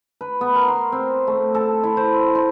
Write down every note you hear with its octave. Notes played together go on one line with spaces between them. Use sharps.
B4
B3
A#4
C6
C4
A3
A4
E4
C5
C6